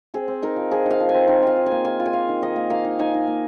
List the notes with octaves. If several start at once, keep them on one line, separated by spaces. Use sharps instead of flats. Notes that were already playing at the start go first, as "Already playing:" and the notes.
C4 G#4
C4
D#4 A#4
F3
F3 G#4
D#4 F5
F3
G#5
C4
D#3 G#5
F4 F5
F4
G#5
A#3
F4 G#5
F4
G#5
A#3 F5
D#3
D#3 D#5
A#3
A#3 F5
D#4
D#4 G#5
D#4
A#3